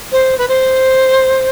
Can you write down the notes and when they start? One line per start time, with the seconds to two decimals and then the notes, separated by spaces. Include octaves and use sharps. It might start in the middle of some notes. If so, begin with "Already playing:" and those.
0.12 C5
0.38 B4
0.48 C5